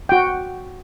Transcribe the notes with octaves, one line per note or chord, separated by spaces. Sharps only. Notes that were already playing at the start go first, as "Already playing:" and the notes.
F#4 G5